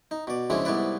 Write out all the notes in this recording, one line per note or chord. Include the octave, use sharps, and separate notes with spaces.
D#4
B2 D5
C#3 F3 G#3 D4 E4
C2 G#2 B3 E4 B4 D5